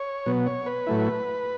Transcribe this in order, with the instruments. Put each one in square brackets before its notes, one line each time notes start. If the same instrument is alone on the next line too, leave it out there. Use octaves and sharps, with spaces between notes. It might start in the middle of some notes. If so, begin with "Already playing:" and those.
Already playing: [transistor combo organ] C#5
B2 F#3 B3
C#5
B4
A2 F#3 A3 E4